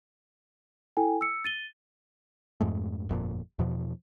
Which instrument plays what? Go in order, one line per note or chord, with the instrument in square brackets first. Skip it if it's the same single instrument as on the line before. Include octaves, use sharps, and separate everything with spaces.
[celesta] E4 A4 G5 G#5
E6 C#7
A6 D#7 G7
[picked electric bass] F2 G#2 G#3 A3
G1 F2 A#2
E2 B2 F3